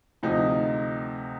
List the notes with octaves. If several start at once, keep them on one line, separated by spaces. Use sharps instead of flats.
D2 C3 F3 D#4